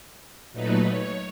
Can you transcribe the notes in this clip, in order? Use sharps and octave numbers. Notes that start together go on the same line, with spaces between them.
A#2 F#3 A3 D#4 B4
C#5